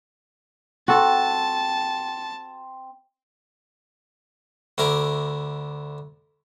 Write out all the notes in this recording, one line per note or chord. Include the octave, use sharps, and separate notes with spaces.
C4 F#4 A4 A5
D2 E4 A#4 D6